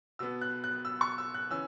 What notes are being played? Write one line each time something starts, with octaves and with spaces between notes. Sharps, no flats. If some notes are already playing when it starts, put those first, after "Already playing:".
B2 B3 E6
F#6
F#6
E6
C#6
E6
F#6
E3 C#4 E6